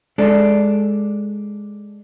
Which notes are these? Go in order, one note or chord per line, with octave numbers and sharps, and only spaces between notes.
G#3 D4 A4